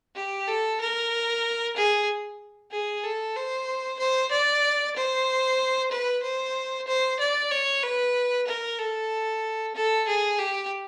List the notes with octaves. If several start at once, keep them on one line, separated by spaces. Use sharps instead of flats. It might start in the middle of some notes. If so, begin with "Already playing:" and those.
G4
A4
A#4
G#4
G#4
A4
C5
C5
D5
C5
B4
C5
C5
D5
C#5
B4
A#4
A4
A4
G#4
G4